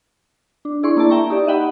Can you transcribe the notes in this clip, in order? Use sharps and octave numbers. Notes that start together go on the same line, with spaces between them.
D4
D4 E4 G#4 D5 C6 C#6
A#3 E4 D5 A5
E5 G5 A#5 C#6
D#4 G4 D5
D#5 E5 F#5 G5 B5